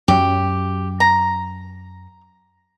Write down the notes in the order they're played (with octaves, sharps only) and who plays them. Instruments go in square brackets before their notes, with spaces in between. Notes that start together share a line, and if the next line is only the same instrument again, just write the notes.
[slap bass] F#2 F#3 [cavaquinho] G4
[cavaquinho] A#5